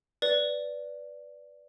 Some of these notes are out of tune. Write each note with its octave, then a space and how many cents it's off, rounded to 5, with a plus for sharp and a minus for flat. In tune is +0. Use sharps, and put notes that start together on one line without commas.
B4 +0 D5 -5